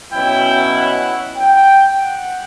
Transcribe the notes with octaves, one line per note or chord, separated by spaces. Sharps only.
B2 F#3 C#4 E4 G5
F#5
G5
F#5